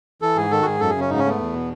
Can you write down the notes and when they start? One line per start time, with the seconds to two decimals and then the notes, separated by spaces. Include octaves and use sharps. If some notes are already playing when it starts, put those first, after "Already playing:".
0.22 E3 A4
0.36 G#2 G#4
0.51 D#3 A4
0.62 F#4
0.65 G#2 G#4
0.80 F#2 A4
0.90 G#4
0.95 C#3 C#4
1.10 G#2 D#4
1.19 C#4
1.24 A3 B3
1.40 E2
1.53 B2